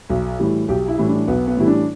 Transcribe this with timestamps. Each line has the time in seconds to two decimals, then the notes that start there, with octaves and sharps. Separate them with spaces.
0.09 B1
0.39 A2 E3 G3
0.68 B1 G4
0.88 E4
0.98 A2 E3 G3
1.08 D4
1.28 B1 B3
1.47 B3
1.57 A2 E3 G3 E4
1.67 D4